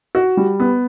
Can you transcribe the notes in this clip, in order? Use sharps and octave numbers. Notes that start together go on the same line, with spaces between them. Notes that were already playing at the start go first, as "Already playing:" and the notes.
F#4
G3
B3